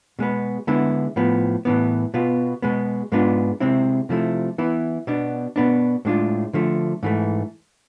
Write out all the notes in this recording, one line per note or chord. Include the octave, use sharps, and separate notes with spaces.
B2 G#3 B3
D3 G#3 B3 E4
A2 F3 B3
A2 E3 B3
B2 B3 F4
B2 G#3 B3
G#2 G#3 B3 D4 F4
C3 G#3 C4 E4
C3 F3 A3 E4
E3 B3 E4
B2 B3 D4
B2 B3 D4
A2 G#3 D4 F4
D3 F3 A3
G#2 E3 A3